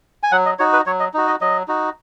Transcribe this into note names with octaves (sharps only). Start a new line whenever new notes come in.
G#5
F#3 F#5
D#5
D#4 F#4 C#5
B4
F#3 C#5
D#5
D#4 F#4
D#5
F#3 D#5
D#4 F#4